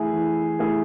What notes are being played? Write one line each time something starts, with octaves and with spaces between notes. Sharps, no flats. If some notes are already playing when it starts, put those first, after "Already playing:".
Already playing: E3 A3 E4 G#4
E3
A3 E4 G#4